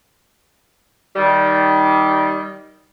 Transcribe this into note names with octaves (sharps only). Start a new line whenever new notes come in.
D#3 G3